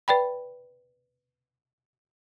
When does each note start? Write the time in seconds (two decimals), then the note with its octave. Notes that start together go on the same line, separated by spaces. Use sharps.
0.08 B4 D5 G5 B5